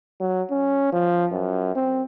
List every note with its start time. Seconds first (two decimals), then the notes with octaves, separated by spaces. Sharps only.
0.20 F#3
0.51 C#4
0.92 F3
1.31 F#2
1.75 C4